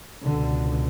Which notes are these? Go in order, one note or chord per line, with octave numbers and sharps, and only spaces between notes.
C#2 B2 D3